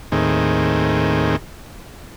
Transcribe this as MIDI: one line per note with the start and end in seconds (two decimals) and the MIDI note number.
0.12 1.36 39
0.12 1.36 45
0.12 1.36 51
0.12 1.36 60
0.12 1.36 68